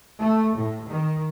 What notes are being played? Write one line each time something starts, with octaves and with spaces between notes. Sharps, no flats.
A3
A2
D#3